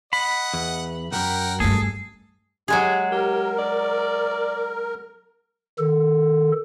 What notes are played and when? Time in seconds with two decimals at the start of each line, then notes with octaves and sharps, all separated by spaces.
0.13 D#5 F#5 B5
0.54 E2
1.12 C2 F#2 A#4 F#5 G5
1.60 G2 A3 G#4 A4
2.68 F#3 G#3 G4 G#4
3.12 G4 A#4
3.58 D5
5.78 D#3 A4